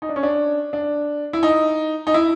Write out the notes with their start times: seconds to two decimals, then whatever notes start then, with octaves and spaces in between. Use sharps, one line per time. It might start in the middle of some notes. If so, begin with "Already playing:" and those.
0.02 D#4
0.09 D4
0.16 C#4
0.23 D4
0.73 D4
1.33 E4
1.43 D#4
2.07 D#4
2.14 E4